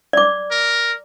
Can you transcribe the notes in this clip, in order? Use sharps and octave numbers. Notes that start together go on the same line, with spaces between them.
D5 D6
A#4